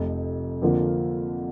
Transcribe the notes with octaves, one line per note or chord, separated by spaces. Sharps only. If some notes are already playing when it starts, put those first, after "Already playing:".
Already playing: F1 F2 C3
F2 D3 F3 A#3 F4